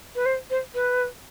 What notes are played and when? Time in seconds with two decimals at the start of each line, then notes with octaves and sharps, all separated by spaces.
0.15 B4
0.26 C5
0.50 C5
0.75 B4